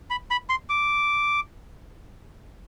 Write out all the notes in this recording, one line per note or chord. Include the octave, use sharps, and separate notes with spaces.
B5
B5
C6
D6